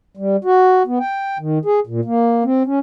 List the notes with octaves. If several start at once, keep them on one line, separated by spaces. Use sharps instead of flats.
G3
F#4
B3
G5
D#3
G#4
A#2
A#3
C4
C#4